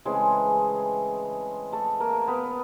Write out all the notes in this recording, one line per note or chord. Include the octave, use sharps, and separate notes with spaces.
C#3 E3 G#3 A3 C4 G#4
A3 A4
A#3 A#4
B3 B4